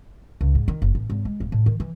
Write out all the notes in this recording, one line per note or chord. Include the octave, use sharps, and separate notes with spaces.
C#2
G#2
D#3
F#1
A1
G#1
G#3
D1
A2
D#3
E3